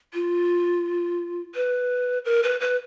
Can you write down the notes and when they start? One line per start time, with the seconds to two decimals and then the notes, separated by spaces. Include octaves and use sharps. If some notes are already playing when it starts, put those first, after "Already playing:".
0.14 F4
1.55 B4
2.25 A#4
2.43 B4
2.60 B4